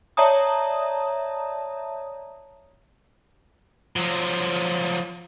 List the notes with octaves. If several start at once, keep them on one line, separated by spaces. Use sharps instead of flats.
C#5 D5 E5 A5 A#5 D#6
F3 F#3